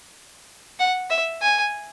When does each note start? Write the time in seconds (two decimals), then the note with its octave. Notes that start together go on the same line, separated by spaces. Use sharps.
0.79 F#5
1.10 E5
1.42 G#5